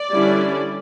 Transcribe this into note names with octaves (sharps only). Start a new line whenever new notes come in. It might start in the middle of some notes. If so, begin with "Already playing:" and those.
Already playing: D5
D3 G3 C#4 E4